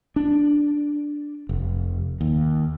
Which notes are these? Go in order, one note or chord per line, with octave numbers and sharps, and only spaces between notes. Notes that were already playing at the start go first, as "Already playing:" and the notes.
D4
F1
D#2